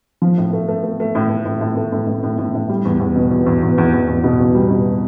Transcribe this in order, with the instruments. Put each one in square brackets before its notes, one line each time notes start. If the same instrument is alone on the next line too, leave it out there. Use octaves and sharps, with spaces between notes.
[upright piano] F3
A2
A3
A3
A3
A3
A2
A3
A2
A2
A3
A2
A2
A2
A2
A2
G3
E2
E2
B2
E2
E2
E2
E2
E2
E2
B2
E2
G3
B2